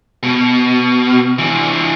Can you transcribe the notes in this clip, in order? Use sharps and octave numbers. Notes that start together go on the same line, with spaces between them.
B2
E3 D4